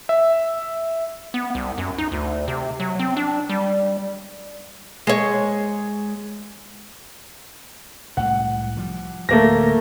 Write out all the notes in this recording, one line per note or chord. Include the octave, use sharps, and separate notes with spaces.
E5
B3
C2
F#2
D#4
D2
C3
F#3
C4
D4
G3
G#3 C#5
C2 A2 G#3 F#5
F3 G3
D1 A3 A#3 A#6